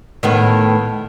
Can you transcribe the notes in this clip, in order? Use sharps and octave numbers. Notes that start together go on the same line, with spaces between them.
A2 D#3 B3